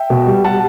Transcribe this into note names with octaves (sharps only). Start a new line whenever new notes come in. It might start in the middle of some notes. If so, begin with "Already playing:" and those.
Already playing: E5 G5
B2
G3
G3 F#5 A5